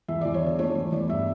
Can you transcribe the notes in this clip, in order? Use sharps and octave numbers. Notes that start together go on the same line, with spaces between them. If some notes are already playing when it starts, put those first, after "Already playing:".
E2 E5
D5
E2
C#5
D3 D5
A3 C#5
E2 C#5
E2 D5
G2 E5